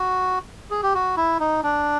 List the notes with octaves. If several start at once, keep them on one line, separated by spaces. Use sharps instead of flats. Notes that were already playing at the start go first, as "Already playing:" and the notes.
Already playing: F#4
G#4
G4
F#4
E4
D#4
D4